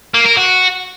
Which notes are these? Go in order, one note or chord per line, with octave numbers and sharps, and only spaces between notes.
A#3
A#4
F#4